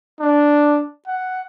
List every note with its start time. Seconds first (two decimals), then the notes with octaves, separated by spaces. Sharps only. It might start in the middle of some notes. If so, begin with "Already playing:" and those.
0.20 D4
1.07 F#5